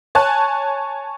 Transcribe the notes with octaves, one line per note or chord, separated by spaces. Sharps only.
C#5 G#5 A5 F#6